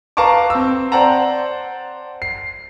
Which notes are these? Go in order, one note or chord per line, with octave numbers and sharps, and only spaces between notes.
B4 F5 A5 A#5 C#6 D6
C4 E6
C5 D5 F#5 G5 A5 A#5
C7